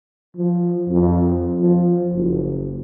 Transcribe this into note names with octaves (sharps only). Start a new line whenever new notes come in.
F3
F2
F3
F#1